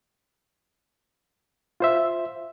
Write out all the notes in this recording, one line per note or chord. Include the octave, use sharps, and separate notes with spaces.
F4 C5 E5